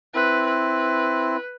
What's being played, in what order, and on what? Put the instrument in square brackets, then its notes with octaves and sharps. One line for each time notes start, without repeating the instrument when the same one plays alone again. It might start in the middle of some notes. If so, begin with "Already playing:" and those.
[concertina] C4 E4 [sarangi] B4
[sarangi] B4